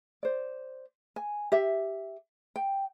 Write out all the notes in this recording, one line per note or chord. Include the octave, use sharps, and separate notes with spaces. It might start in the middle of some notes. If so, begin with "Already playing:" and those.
C5 D5
G#5
G4 E5
G5